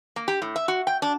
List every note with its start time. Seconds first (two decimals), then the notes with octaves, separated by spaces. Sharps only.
0.16 A#3
0.28 G4
0.42 A2
0.56 E5
0.68 F#4
0.87 G5
1.02 D4